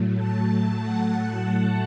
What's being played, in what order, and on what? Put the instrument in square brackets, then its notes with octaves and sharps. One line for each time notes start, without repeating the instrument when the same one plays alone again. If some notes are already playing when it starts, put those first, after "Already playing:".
Already playing: [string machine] A2 F#3 A3
A5
F#5
A5